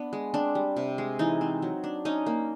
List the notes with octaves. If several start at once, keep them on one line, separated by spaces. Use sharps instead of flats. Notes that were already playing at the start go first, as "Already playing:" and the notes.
Already playing: B3 D4
G#3
C4 D4
G3
C3
G#3
E3 D#4
C4
F#3
D4
C#4 D#4
A#3